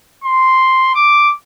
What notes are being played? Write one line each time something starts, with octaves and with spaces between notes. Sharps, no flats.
C6
D6